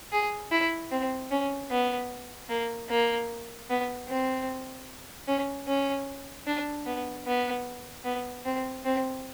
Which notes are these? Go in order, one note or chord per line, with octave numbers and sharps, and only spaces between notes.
G#4
E4
C4
C#4
B3
A#3
A#3
B3
C4
C#4
C#4
D4
B3
B3
B3
C4
C4